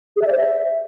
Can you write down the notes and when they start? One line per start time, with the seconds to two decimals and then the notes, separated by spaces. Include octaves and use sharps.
0.16 G#4
0.22 E5
0.27 D5
0.32 C5
0.37 E5